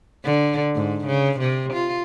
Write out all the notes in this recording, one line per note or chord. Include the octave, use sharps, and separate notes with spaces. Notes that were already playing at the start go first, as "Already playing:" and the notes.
D3
G#2
C#3
C3
F4